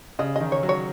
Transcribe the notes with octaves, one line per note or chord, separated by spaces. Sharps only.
C#3 D#5
D#3 D#5
C#5
F#3
C#5